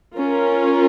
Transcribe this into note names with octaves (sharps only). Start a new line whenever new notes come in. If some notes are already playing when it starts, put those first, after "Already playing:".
C#4 F4 A#4